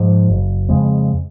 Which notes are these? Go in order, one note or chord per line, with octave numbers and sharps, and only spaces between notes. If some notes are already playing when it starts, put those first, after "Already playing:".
Already playing: G#2 F3
F#1
F2 C#3 G#3